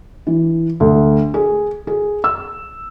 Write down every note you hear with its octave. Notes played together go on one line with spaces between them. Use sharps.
E3
D2
G#4
G#4
E6